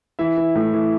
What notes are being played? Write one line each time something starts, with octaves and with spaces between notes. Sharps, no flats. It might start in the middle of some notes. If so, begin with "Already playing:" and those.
E3 E5
E3
A2
E3